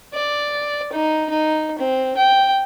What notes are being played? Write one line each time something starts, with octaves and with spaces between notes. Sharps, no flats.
D5
D#4
D#4
C4
G5